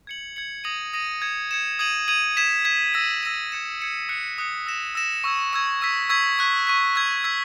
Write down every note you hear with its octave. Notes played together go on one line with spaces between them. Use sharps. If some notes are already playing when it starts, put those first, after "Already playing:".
G#6 C#7 F#7
G#6 C#7 F#7
D#6 A#6 D#7 F#7
D#6 A#6 D#7 F#7
G#6 C#7 E7
G#6 C#7 E7
D#6 G#6 D#7 F#7
D#6 G#6 D#7 F#7
G#6 B6 E7
G#6 B6 E7
E6 A#6 D#7
E6 A#6 D#7
G#6 C#7 E7
G#6 C#7 E7
D#6 F#6 C#7
D#6 F#6 C#7
E6 A#6 E7
E6 A#6 E7
C#6 E6 G#6
C#6 E6 G#6
C#6 E6 G#6 B6
C#6 E6 G#6 B6
C#6 F#6 B6
C#6 F#6 B6
E6 G#6 B6
E6 G#6 B6